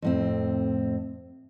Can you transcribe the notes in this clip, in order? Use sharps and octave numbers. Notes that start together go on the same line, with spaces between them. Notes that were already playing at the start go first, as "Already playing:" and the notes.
F2 A2 C4